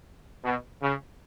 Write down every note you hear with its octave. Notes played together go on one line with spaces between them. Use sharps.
B2
C#3